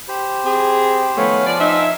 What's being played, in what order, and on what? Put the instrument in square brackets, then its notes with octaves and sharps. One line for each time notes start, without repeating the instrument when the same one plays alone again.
[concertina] G4 C5 B5
[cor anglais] C4 [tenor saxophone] G#4
[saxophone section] D#3 F3 A3 [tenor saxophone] B3 [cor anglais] C#5 [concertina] F5 G#5
[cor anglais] F3 [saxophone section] D5
[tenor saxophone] D#4 [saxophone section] E5